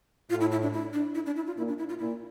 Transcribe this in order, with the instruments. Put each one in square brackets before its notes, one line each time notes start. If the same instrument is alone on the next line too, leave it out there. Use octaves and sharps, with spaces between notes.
[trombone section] A2 [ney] F4
[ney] E4
E4
D4
E4
D4
E4
D4
E4
F4
[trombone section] A#2 [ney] E4
[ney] D4
E4
F4
[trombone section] A#2 [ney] E4